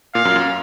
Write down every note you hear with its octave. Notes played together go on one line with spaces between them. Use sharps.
A#2 F5
F#2
F#2